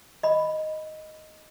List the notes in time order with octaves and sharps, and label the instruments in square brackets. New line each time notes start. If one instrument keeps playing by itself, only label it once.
[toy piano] D#5 B5